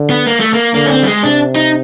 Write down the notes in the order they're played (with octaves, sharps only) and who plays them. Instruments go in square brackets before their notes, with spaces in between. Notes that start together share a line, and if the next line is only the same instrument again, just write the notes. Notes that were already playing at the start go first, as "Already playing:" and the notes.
Already playing: [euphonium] D3
[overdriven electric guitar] B3
A#3
A3
A#3
[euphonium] D3 [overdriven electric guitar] A#3
[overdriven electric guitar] C#4
C4
G3
G#3
[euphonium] C3 [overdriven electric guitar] D4
[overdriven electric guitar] D#4